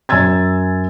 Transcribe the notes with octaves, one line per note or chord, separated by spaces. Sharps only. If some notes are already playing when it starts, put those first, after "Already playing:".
F#2 G#5 E6 G#6 A6